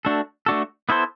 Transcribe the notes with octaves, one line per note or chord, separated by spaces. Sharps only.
A3 D4 F#4 A4
A3 D4 F#4 A4
B3 E4 A4 C5